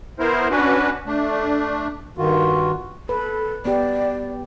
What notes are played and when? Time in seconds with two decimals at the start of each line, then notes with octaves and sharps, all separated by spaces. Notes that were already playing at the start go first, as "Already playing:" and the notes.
0.19 B3 E4 A#4 C5
0.50 C#4 D4 F#4 B4
1.06 A3 D4
2.18 G2 D#3 F4 F#4
3.09 A4 B4
3.65 B3 G4 D5